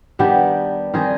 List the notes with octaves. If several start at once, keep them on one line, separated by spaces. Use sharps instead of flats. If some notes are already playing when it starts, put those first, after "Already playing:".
D#3 G3 B3 D4 G4
D#3 G3 C4 D#4 G#4